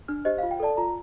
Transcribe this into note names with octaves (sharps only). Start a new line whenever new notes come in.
D4 F6
G4 C5 D#5
F4 F5
G5
A4 D5 A5
F4 A#5